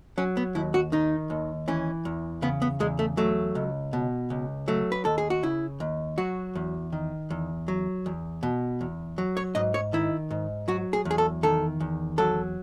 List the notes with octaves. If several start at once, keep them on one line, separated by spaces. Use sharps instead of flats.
F#3 C#4
B3
D#2 E4
F#4
D#3 D#4
D#2
E3 C#4
E2
C#3 B3
B3
E2 G#3
A3
F#3 A3
C#2
B2
C#2
F#3 A3
B4
D#2 A4
G#4
F#4
C#3 E4
D#2
F#3 F#4
E2
D#3
E2
F#3
E2
B2
E2
F#3
C#5
G#2 D#5
C#5
D#3 E4
G#2
F#3 F#4
G#4
E2
G#4
A4
D#3 A4
E2
F#3 A4